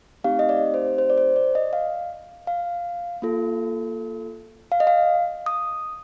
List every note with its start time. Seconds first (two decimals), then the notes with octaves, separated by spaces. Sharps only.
0.24 A3 C4 D#4 G4 F5
0.39 D#5
0.49 D5
0.74 C5
0.98 C5
1.10 D5
1.18 C5
1.36 D5
1.55 D#5
1.73 F5
2.47 F5
3.22 A#3 F4 A4
4.72 F5
4.80 D#5
4.87 F5
5.46 D#6